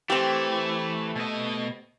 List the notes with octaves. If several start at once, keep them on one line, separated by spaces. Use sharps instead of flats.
E3 A3 C4 G4
B2 D#5